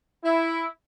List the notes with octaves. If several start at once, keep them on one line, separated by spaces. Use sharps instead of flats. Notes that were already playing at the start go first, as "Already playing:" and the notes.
E4